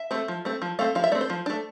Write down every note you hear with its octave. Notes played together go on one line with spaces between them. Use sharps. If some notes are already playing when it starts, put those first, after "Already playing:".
Already playing: E5
A3 C4
F3
A3 C4
F3
A3 C4 F5
F3 F5
E5
A3 C4 D5
C5
F3
A3 D4